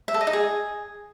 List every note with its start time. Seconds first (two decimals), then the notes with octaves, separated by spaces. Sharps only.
0.08 E5
0.14 A4
0.21 D#5
0.27 D#4
0.33 G#4